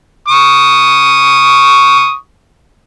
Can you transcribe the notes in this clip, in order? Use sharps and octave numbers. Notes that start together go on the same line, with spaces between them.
C#6 D#6